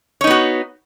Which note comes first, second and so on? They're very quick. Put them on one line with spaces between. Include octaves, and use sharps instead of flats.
C#5 D#4 B3 F#4